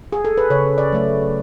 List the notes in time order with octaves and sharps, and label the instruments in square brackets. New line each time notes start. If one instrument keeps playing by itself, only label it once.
[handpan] G#4
A4
B4
C#3 C#5
D5
F#3 A3